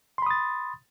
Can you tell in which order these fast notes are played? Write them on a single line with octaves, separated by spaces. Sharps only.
C6 B5 D#6 A6